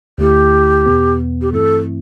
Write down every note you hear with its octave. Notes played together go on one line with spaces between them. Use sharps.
D2 D3 A3 E4 G4
E2 B2 B3
G4
G2 E3 A3 C4 E4 A4